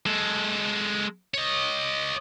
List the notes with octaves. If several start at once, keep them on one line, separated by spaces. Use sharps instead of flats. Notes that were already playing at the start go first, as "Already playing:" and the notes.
G#3 A4
C#5 D#5